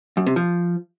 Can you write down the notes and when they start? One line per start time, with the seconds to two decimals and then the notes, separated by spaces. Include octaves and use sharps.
0.17 F#2
0.27 C3
0.36 F3